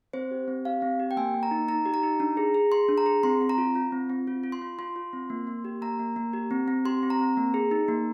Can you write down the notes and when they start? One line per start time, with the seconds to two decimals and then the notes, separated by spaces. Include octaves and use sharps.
0.13 C4 C5
0.31 G4
0.48 C4
0.65 G4 F5
0.82 C4
1.00 G4
1.11 G5
1.17 A#3 G#5
1.34 A#3
1.43 A#5
1.51 D#4
1.68 D#4 A#5
1.85 G4
1.94 A#5
2.03 D#4
2.20 D4
2.37 G#4
2.54 G#4
2.72 G#4 C6
2.88 D4
2.98 A#5
3.06 G#4
3.23 C4 C6
3.41 C4
3.49 A#5
3.58 F4
3.75 F4
3.92 C4
4.10 C4
4.27 F4
4.43 F4
4.52 C6
4.62 F4
4.79 F4 C6
4.96 F4
5.13 C4
5.30 A#3
5.47 A#3
5.65 G4
5.82 A#3 A#5
5.99 A#3
6.16 A#3
6.33 G4
6.51 C4
6.68 C4
6.85 G4 C6
7.03 C4
7.10 A#5
7.19 C4
7.37 A#3
7.54 G#4
7.71 D#4
7.88 A#3